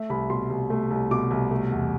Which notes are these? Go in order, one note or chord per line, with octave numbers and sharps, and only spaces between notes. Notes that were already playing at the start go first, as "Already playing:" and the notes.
Already playing: A3 E5
C2 B5
B2 C6
C2
A3
C2
B2 D6
C2
A3
E2